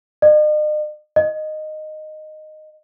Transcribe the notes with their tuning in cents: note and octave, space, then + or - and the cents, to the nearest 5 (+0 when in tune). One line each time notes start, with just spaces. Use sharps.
D#5 -45
D#5 -10